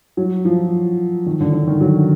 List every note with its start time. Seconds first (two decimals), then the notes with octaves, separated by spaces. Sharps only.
0.17 F#3
0.45 F3
1.26 D#3
1.41 D3
1.53 D3
1.67 D#3
1.81 F#3